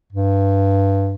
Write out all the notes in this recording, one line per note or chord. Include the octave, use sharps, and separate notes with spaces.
G2